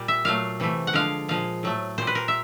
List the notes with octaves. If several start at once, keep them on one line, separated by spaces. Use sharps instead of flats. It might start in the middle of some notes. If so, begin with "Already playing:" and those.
Already playing: A#2 G3
E5
A#2 F#3 A3 F5
C3 E3 A3
F#5
D3 F3 G#3 F5
A#2 F3 G#3 F5
A2 F#3 A3
A#2 G3 C5
B4
A#4
E5